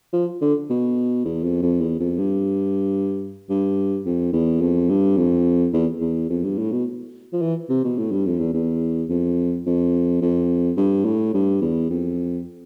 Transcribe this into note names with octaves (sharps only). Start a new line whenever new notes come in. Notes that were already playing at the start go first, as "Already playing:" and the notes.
F3
D3
B2
E2
F2
F2
E2
F2
G2
G2
F2
E2
F2
G2
F2
E2
E2
F2
G2
A2
B2
F3
E3
C3
B2
A2
G2
F2
E2
E2
F2
F2
F2
G2
A2
G2
E2
F2